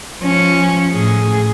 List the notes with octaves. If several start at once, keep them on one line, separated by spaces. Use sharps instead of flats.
F3 C#4
A2 G#4